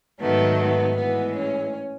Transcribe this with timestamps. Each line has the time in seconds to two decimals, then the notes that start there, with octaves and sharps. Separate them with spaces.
0.20 G#2 D#3 F#3 A3 B3
0.59 B3
0.97 A2 E3 G#3 B3
1.35 C#4